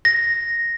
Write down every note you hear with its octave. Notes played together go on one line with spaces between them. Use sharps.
A#6